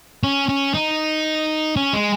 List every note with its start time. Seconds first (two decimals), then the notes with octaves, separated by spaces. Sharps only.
0.24 C#4
0.49 C#4
0.74 D#4
1.76 C#4
1.93 G#3